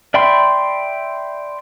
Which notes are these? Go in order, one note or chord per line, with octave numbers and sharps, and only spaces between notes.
D5 E5 G5 B5 C6